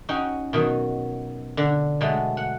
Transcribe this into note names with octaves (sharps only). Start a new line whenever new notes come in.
C#4 D#4 F#4 G5
B2 D#3 F#3
D3
B2 F#3 G#3 A3
F#5